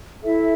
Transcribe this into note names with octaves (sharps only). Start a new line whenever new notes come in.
E4 A4 E5